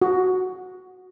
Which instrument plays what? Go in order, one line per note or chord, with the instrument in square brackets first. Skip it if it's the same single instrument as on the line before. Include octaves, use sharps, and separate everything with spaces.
[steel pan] F#4